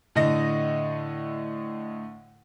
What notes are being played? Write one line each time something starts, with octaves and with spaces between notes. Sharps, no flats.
A2 D3 D#5 A#6